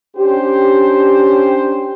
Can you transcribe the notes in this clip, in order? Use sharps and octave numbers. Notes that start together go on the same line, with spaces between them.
C#4 D4 G4 C5